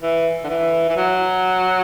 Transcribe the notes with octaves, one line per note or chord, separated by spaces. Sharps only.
E3
D3
E3
E3
F#3